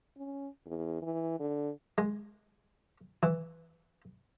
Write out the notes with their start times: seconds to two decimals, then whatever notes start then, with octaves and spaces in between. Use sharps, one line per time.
0.17 C#4
0.66 E2
1.02 E3
1.40 D3
1.98 G#3
3.23 E3